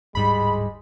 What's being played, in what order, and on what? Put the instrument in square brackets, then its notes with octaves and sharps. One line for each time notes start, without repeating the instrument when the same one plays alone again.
[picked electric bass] D1 G#2 G3 [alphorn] G#3 [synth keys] B5